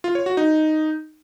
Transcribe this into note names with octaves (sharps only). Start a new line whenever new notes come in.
F4
C#5
F#4
D#4